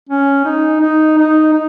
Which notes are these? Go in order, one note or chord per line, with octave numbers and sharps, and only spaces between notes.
C#4
D#4
D#4
D#4
D#4